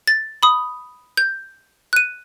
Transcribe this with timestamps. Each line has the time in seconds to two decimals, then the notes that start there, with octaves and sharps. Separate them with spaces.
0.08 A6
0.43 B5 D#6
1.17 G6
1.93 F#6 D#7